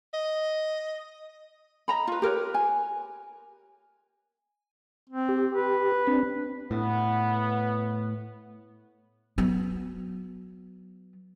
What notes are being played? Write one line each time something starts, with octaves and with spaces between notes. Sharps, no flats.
D#5
D#5 A#5 B5
F4 B4
G4 A#4 B4 C#5
G#5
C4
G4
B4
C4 D4
A2 B3
F#3 B3